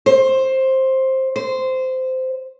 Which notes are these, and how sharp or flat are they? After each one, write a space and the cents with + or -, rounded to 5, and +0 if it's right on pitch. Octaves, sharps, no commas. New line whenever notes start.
C5 +10
C5 -15